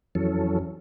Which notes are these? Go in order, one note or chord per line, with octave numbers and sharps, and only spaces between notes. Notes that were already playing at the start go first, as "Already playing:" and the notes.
F2 E3 F#3 C#4 A4